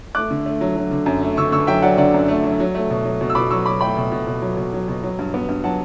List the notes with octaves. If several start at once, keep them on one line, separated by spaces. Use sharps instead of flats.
A3 D6 F#6
D3
A3
F#3
F#3
D3
F#2
A3
D3 C#6 E6
D3 C#6 E6
F#3 E5 G5
F#3 D5 F#5
D3 D5 F#5
F#2
A3
F#3
F#3
A3
B2
F#3
B2
E6
B2 B5 D6
F#3 C#6 E6
F#3 B5 D6
A3 G5 B5
B2
B2
B2
F#3
B2
F#3
B2
F#3
G2
B3
G2
F#3 F#5 A5